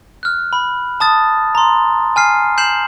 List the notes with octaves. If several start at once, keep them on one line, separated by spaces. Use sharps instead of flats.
F6 F#6
B5
A5 D#6 A6
A#5 C6
G#5 F6 C7
G6 C7 E7 F#7